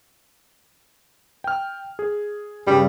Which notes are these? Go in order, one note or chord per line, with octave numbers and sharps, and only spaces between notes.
G5 F6
G#4
G2 C#3 G3